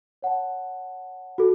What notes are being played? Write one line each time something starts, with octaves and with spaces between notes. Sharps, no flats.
C#5 F#5 A5
F#4 A4